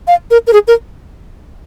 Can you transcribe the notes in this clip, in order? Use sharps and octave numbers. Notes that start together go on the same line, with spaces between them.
F5
A#4
A#4
G#4
A#4